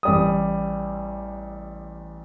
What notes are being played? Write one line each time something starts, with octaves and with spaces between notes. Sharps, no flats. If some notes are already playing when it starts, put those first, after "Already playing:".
A1 G3 D#6